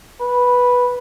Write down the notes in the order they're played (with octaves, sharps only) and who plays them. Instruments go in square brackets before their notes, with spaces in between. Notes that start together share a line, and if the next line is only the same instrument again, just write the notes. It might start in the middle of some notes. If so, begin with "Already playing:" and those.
[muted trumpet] B4